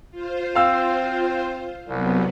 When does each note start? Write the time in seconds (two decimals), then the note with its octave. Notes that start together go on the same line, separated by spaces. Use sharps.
0.11 F4 C5
0.55 C4 F5 E6
1.88 C2 C3 F#3 B3